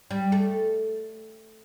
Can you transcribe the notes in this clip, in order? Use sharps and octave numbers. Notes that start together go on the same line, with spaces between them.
G3
A3